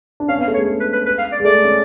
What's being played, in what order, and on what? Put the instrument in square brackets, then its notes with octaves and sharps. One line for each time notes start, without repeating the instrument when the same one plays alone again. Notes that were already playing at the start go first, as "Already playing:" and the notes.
[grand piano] D4
[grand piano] C#4 [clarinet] F5
[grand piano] B3
[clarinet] F5
[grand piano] A3
[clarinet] C#5
[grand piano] G#3
G#3
[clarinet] B4
B4
B4
F5
D5
[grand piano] G#3
[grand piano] A3 [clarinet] D5
[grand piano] C#4